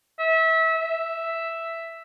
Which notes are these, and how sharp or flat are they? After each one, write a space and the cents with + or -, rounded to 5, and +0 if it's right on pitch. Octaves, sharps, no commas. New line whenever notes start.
E5 -25
E5 +0